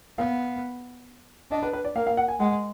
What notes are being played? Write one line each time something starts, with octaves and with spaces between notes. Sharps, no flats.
B3 F5
D4 D#5
B4
B4
D5
A#3 F5
F5
F#5
G#5
G#3 F#5